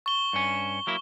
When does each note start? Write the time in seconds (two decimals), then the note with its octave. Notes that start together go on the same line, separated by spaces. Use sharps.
0.06 C#6 G7
0.33 G2 C#4
0.87 F#3 A#3 E4